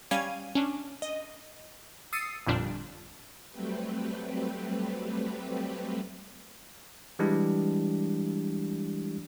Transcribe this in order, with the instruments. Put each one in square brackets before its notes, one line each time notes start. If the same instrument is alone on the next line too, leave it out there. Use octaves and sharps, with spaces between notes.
[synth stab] G3 C#4 F5 G#6 D#7
C#4 D4
D#5
D#6 E6 A6 C7 C#7 D#7
G1 F2 A#2 G3 D4
[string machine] F#3 G3 A3 C4 G4 B4
[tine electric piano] E3 G3 G#3 D4 E4 G4